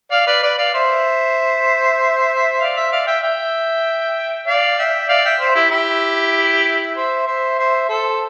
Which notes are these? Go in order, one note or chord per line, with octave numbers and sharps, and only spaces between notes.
D5 F5
B4 D5
B4 D5
D5 F5
C5 E5
D5 F5
C5 E5
D5 F5
E5 G5
E5 G5
D5 F5
E5 G5
D5 F5
E5 G5
C5 E5
E4 G4
E4 G4
C5 E5
C5 E5
C5 E5
A4 C5